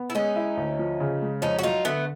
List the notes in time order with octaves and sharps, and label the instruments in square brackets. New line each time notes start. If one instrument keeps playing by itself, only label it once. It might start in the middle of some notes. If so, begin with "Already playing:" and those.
Already playing: [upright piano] B3
[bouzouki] E4
[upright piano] G#3 [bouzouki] C#4 D#4
[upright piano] E4
D2
F3
C#3
G#3
[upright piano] F2 [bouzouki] C#4 D#4
[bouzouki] F#4
[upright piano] F#3 [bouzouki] D#4 F4
[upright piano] D3 [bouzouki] A3 B3